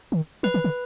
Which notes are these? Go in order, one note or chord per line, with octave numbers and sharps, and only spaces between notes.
D#3
F3 B4
D#3
D3